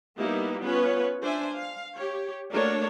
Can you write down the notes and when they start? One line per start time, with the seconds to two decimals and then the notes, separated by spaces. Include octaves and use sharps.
0.17 G3 A#3 B3 D#4 E4 G4
0.62 B3 C#4 F4 B4 C#5
1.21 D4 C5 E5 G#5
1.56 F5
1.95 G4 C#5
2.53 A3 A#3 D4 F#4 A#4 C#5